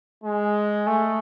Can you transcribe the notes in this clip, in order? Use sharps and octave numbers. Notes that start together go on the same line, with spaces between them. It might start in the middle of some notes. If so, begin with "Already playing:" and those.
G#3
A3